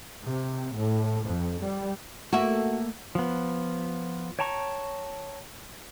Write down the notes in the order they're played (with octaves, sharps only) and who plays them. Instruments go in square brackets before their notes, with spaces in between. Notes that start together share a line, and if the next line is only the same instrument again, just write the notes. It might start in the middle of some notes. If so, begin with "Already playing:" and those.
[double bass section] C3
A2
F2
G3
[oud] A3 A#3 E5 [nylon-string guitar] F#4
[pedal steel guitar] F3 B3
C#5 G5 A5 A#5 C#6